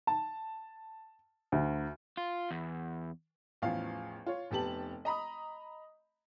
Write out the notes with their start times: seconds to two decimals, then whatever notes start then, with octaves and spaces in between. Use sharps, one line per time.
0.07 A5
1.52 D2
2.17 F4
2.51 E2
3.62 A1 E2 F3 F5
4.26 F4 C#5
4.51 F1 B3 G4 A5 F#7
5.05 D#5 A#5 B5 D#6